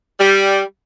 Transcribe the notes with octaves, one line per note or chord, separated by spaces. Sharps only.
G3